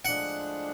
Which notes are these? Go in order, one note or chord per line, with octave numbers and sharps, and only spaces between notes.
A2 F3 G#3 D4 F#5